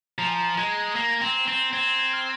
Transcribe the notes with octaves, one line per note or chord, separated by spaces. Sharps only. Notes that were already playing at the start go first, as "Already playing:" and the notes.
F3 A#5
G#5
A#5
G#3 G#6
A#6
G#6
A#3 C7
C4
C4
C4 G#6
G#6
F6